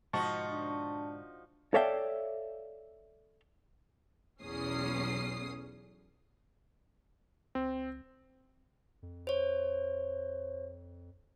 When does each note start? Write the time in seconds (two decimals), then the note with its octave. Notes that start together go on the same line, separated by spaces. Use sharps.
0.13 G#2 B2 D3 F3 D#4 F#4 A5 C#6
0.50 D4
1.74 A4 C#5 D5 E5 F5 G5
4.41 B1 E2 C#4 D#6 C7
7.55 C#2 C4
9.02 F2
9.27 C5 C#5